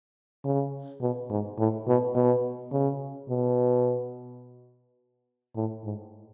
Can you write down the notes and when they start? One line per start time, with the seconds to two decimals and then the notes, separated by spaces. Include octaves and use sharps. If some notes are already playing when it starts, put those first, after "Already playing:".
0.44 C#3
1.01 B2
1.30 G#2
1.58 A2
1.87 B2
2.15 B2
2.72 C#3
3.29 B2
5.56 A2
5.84 G#2